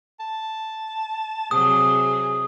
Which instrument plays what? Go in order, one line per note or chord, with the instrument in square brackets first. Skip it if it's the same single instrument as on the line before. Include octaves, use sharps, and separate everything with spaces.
[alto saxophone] A5
[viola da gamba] C3 F#3 [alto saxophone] G#4 [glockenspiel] D#6